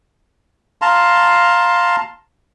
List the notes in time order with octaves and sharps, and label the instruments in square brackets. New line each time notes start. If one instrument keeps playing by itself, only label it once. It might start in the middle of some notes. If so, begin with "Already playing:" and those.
[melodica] F5 A5 A#5 C6